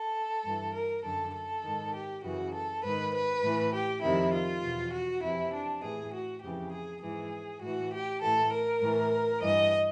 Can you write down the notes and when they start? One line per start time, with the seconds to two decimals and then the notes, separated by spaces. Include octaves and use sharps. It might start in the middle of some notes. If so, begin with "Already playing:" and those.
Already playing: A4
0.43 G2 E3
0.73 A#4
1.03 F#2 D3 A4
1.34 A4
1.63 G#2 D#3
1.93 G4
2.23 F#2 C#3 E3 F#4
2.53 A4
2.83 G#2 D#3 B4
3.13 B4
3.43 A2 E3
3.73 G4
4.02 F2 C3 D#3 E4
4.33 F4
4.62 E2 B2
4.92 F#4
5.22 F2 C3 E3 E4
5.52 D4
5.82 A2 E3 G#4
6.12 F#4
6.41 F2 C#3 E3 G4
6.72 G#4
7.02 G#2 E3 G#4
7.62 A2 E3 F#4
7.92 G4
8.21 A2 E3 A4
8.52 A#4
8.82 A2 E3
9.41 G2 E3 D#5